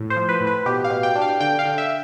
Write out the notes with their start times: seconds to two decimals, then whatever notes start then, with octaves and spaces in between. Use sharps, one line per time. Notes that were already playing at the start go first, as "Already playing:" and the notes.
Already playing: A2
0.10 C5
0.16 F3
0.29 B4
0.40 A2
0.47 B4
0.66 B2 G4
0.84 F5
0.90 B2
1.03 G5
1.16 D4
1.22 F5
1.40 D3 G5
1.59 F5
1.65 D3
1.78 E5